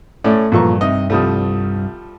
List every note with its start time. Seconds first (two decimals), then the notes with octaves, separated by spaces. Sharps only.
0.24 A2 A3 C#4 D5
0.52 E2 G2 A#2 F3 A4 A#5 C#6
0.81 C3 D#4 D#5 E5
1.10 C2 F3 G3 A3 D#6